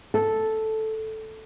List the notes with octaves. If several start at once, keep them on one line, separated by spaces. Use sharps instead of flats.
A4